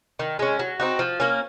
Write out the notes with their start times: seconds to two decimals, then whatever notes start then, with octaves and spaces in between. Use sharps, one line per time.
0.19 D#3
0.39 G#3 C#4
0.59 F#3
0.80 C4 D#4 F#4
0.99 F3
1.20 A#3 C#4